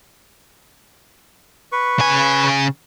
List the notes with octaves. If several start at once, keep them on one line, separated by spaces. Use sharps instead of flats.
B4 C#6
C#3 G#5